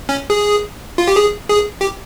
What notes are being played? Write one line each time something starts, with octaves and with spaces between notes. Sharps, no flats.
C#4
G#4
F4
G4
G#4
G#4
G4